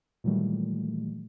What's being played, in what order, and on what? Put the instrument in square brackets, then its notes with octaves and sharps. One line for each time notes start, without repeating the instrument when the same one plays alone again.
[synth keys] A#2 D#3 E3 F#3 G3 A3